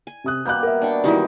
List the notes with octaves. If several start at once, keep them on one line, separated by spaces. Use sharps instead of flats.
G#5
C3 D#6 F#6
B2 G3 A#3 F#6 G6
A#4 E5
D4 G5 C#6
F#2 D#3 E3 G3 D#4 E4 F#4